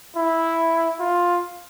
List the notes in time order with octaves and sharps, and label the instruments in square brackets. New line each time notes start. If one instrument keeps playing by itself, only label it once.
[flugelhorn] E4
F4